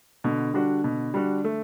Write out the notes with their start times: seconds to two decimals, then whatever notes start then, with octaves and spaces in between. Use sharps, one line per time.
0.24 B2 D3
0.54 G3 D4 F#4
0.84 B2
1.14 G3 D4 F#4
1.45 A3